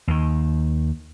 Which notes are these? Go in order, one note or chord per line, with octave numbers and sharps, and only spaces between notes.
D#2 D#3